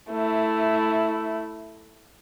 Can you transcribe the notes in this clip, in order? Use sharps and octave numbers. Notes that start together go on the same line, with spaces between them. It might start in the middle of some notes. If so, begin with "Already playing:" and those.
A3 E4